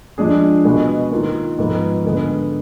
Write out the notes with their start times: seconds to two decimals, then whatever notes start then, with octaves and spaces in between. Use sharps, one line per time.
0.18 F3 G#3 D4 G#4
0.65 B2 G#3 B3
1.11 D#3 A#3 F4
1.58 G#2 F3 B3
2.04 D3 G#3 B3